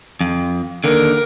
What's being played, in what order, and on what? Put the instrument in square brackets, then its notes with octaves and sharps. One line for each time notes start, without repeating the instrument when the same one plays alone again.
[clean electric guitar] F2
[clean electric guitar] D#2 D3 [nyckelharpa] A#4